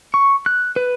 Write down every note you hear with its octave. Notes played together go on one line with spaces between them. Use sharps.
C#6
F#6
B4